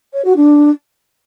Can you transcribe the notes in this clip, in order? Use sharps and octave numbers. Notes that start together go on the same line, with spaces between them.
C#5
F#4
D4